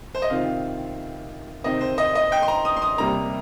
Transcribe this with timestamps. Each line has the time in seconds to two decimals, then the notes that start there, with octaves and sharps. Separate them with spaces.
0.15 C5
0.22 D#5
0.30 C3 D#3 C4 F4 F5
1.64 C3 D#3 C4 D#4 D#5
1.81 C5
1.98 D#5
2.15 D#5
2.32 G5
2.42 C6
2.48 A#5
2.65 D#6
2.77 C6
2.82 D#6
2.98 C3 G3 A#3 A#5